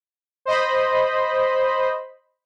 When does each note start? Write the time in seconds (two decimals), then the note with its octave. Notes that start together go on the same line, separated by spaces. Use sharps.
0.45 C5 D#5 B5